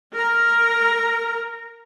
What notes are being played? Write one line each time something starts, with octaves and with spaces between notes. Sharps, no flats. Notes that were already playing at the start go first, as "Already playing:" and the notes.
A#4 A#5